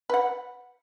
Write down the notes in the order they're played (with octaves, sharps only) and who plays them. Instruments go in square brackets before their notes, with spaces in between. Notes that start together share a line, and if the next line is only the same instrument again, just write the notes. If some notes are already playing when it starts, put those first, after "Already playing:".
[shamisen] B4 F#5